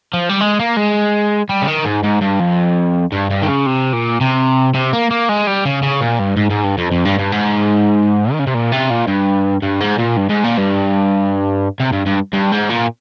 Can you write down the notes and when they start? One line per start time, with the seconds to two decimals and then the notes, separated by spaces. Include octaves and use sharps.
0.13 F3
0.29 G3
0.41 G#3
0.59 A#3
0.77 G#3
1.49 G3
1.62 C#3
1.68 D#3
1.85 G#2
2.04 G#2
2.22 G2
2.40 F2
3.12 G2
3.30 G2
3.42 D#3
3.48 C#3
3.66 C3
3.93 A#2
4.21 C3
4.74 C3
4.93 A#3
5.11 A#3
5.29 G#3
5.47 G3
5.65 C#3
5.83 C#3
6.01 A#2
6.19 G2
6.37 G#2
6.51 G#2
6.64 G2
6.78 F2
6.92 F2
7.05 G2
7.19 G2
7.32 G#2
8.32 D#3
8.39 C#3
8.47 C3
8.54 A#2
8.72 C3
8.90 A#2
9.08 G2
9.63 G2
9.81 G#2
9.99 A#2
10.17 G2
10.30 G#2
10.44 A#2
10.58 G2
11.80 C3
11.93 G2
12.06 G2
12.34 G2
12.52 G#2
12.70 A#2